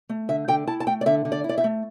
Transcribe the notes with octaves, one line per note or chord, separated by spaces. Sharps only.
A3
D3 E5
D3 G5
E4 A5
A5
A3 G5
D5
D3 E5
D3
D5
E4
D5
E5
A3